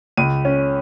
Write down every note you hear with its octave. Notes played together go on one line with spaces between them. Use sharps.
C#2 D#7
C#4